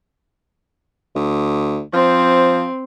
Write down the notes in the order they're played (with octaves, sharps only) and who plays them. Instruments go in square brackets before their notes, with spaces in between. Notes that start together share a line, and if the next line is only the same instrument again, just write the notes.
[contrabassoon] D2
[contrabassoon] F3 [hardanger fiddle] C4